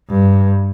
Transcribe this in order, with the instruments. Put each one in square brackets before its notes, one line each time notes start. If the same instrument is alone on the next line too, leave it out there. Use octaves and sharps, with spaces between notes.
[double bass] G2